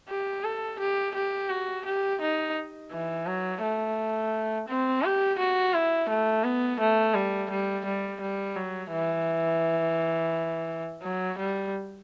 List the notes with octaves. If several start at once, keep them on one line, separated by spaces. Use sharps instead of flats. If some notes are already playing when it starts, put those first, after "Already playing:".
G4
A4
G4
G4
F#4
G4
D#4
E3
F#3
A3
C4
G4
F#4
E4
A3
B3
A3
G3
G3
G3
G3
F#3
E3
F#3
G3